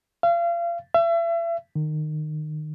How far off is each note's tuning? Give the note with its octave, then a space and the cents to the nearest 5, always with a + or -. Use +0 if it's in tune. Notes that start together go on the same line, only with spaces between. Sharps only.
F5 -35
E5 +35
D#3 -25